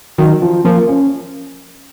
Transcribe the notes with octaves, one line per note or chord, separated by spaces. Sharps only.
D#3 F#3
F3
F3 A#3
C#4